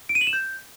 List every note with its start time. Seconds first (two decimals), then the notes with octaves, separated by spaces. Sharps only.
0.09 D7
0.15 D#7
0.21 F#7
0.27 E7
0.33 G6